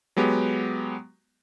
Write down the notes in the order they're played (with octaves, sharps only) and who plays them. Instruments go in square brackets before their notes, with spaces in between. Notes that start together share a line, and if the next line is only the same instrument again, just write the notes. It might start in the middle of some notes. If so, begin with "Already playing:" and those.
[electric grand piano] F#3 G#3 B3 G4